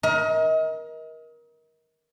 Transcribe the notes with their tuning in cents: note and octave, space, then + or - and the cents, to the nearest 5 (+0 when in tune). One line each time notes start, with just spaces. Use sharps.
A#4 +25 D#5 +35